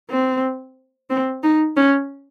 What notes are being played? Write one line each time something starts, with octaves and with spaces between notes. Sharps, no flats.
C4
C4
D#4
C#4